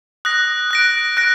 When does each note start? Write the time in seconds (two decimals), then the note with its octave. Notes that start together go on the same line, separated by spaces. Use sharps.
0.25 D#6 F#6 A#6
0.71 F#6 A#6 D7
1.17 F#6 A#6 D7